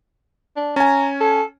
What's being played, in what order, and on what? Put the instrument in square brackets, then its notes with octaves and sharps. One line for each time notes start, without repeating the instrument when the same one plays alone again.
[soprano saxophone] D4
[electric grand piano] C#4 G#5 [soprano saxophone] A#5
[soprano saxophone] A4